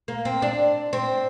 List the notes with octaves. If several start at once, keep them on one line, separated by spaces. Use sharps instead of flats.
A#3
C4
D4
C4